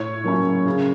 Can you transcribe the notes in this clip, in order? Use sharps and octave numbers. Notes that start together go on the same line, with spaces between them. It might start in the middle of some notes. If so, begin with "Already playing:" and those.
Already playing: A2 C#5
F#3 A#3 C#4 E4
C#3